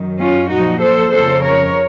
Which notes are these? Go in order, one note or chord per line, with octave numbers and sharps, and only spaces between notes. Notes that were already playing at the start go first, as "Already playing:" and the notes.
Already playing: F#2 D#3
C#4 F4
A#2 F3 D#4 F#4
A4 C5
F2 C#3 F3 A4 C5
A#4 C#5